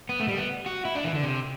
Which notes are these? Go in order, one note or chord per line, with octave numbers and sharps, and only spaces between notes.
B3
A3
G3
B3
F#4
E4
D4
E3
D3
C3